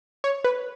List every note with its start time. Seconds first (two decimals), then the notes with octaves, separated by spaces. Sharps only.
0.24 C#5
0.45 B4